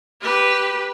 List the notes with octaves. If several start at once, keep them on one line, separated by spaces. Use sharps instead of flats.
G4 B4